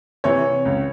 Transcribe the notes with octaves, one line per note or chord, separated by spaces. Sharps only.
C3 E3 C#5
C#2